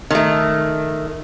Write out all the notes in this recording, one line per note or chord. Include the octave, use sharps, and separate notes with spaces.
D#3 A3